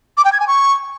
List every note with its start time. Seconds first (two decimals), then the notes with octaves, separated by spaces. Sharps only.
0.17 D6
0.25 G5
0.32 G#6
0.40 G#5
0.48 C#6